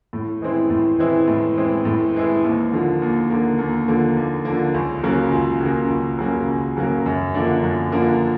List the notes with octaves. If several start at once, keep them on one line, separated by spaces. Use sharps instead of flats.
A2
E3 G#3 C4 E4
A2
E3 G#3 C4 E4
A2
E3 G#3 C4 E4
A2
E3 G#3 C4 E4
D#2
D3 F3 A#3
D#2
D3 F3 A#3
D#2
D3 F3 A#3
D#2
D3 F3 A#3
C#2
C#3 F#3 A#3
C#2
C#3 F#3 A#3
C#2
C#3 F#3 A#3
C#2
C#3 F#3 A#3
F#2
D3 F3 A#3 D4
F#2
D3 F3 A#3 D4